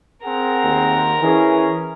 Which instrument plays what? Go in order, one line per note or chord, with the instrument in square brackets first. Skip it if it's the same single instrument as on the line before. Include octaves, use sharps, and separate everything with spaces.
[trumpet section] C4 G#4 F#5 [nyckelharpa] A#4 A#5
[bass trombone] D#2
[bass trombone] E3 [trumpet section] C#4 G#4